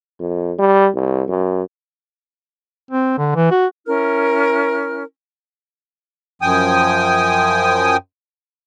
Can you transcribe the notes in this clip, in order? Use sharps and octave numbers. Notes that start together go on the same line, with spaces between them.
F2
G3
C2
F#2
C4
D3
E3
F#4
C#4 E4 A#4 F6
F#2 F3 G5 G#5 D#6